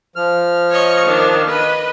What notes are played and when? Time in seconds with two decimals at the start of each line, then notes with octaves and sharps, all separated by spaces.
0.16 F3 F6
0.70 C#5 D#5 C#6
1.05 D#3 D4
1.47 B4 D#5